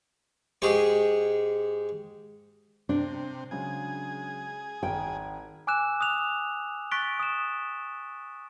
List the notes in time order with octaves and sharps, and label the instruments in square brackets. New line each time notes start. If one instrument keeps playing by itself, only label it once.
[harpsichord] G#2 G4 G#4 C#6
[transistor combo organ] C3 [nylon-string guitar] D4
[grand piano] C#3 F#3 G#3 [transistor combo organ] G#4
[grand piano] G#1 D#3 [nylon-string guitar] G5
[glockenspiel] G#5 D6 E6 F#6 E7
D#6 F#6 F7
C#6 F#6 A6 B6 D7 G7
D#6 E7